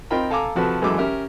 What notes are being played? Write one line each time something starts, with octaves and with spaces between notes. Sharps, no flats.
C4 D#4 F4 A#4 G5 B5
A4 F5 G#5 A#5 D6
C3 F3 F#4 A4 B4
F#2 E3 F#3 G#3 A4 D6
C#4 G4 A#4 E5